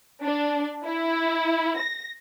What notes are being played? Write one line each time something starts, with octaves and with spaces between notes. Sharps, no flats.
D4
E4
A#6